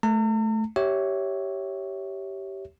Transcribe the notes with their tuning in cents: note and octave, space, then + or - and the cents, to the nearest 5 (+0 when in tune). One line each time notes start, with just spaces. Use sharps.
A3 -15 A#5 -45
G4 -15 C#5 +0 E5 -10